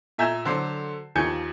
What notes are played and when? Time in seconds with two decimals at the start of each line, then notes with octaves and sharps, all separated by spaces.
0.18 A#2 E5 G#5 A#5 G6 E7
0.45 D3 F#3 A4 C5 D5 C7
1.15 D#2 D#3 F3 G#5 G6 C#7